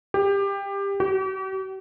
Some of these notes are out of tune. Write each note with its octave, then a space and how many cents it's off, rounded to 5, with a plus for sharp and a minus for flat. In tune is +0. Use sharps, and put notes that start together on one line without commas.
G4 +20
G4 -45